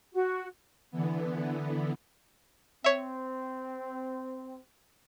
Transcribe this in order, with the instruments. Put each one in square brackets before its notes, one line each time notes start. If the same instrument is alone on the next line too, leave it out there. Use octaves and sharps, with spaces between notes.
[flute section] F#4
[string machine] D3 E3 B3
[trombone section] C4 [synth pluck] C#5 E5